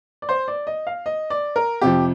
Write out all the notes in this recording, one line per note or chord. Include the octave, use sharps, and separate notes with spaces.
D5
C5
D5
D#5
F5
D#5
D5
A#4
F2 C3 F3 G4